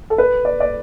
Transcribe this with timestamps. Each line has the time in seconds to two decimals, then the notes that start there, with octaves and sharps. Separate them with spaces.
0.10 A4
0.18 B4
0.45 D5
0.60 D5